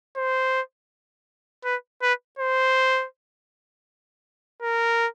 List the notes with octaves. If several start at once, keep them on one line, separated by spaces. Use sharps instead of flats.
C5
B4
B4
C5
A#4